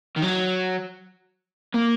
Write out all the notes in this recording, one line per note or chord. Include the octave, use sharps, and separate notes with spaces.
D#3
F#3
A#3